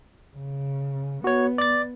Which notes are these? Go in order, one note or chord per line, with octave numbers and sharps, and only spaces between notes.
C#3
B3 F#4 C#5
D5 A6